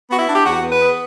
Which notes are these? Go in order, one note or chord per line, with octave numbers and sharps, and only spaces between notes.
B3 F#4
E4
D4
G4
E2 F#4
B3
B4
B3